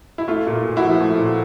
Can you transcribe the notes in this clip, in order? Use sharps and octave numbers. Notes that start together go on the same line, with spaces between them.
E4
A3 F4
A#2
A#2
E4 F#4
F3
A3
A#2